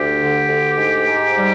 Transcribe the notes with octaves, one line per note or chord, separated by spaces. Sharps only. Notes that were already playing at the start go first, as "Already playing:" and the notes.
Already playing: D2 G4
D3
D2
G#2
G#2
G3